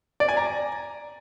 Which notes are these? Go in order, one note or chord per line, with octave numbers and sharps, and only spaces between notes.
D5
G#5
A#5